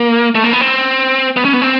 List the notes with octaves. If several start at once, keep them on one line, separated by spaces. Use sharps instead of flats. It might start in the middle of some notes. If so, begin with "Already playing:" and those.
Already playing: A#3
A3
A#3
B3
C4
B3
C#4
B3
C4